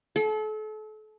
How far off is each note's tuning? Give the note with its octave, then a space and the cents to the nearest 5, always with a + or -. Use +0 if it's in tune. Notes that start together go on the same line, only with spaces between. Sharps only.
A4 -35